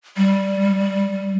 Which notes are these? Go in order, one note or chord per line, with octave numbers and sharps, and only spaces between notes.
G3